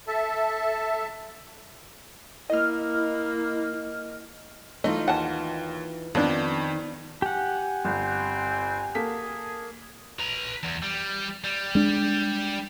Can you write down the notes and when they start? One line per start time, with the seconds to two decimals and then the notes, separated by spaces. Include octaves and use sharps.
0.08 A4 E5 A5
2.50 A#3 E4 D#5 F6
4.84 E3 A3 D#4 F4 D#5
5.08 D#2 F#5 A5
6.15 F2 D#3 F3 B3 D4
7.22 G4 F#5 G#5
7.85 G1 C4
8.95 A#3 G#4 A4 B6
10.19 B4 A#5
10.63 E2
10.83 G3
11.44 G3
11.75 G#3 D4